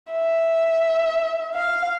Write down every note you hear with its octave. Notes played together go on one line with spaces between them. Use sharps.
E5
F5